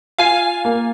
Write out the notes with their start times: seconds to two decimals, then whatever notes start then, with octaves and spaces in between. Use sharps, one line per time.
0.18 F4 F5 G#5
0.65 A#3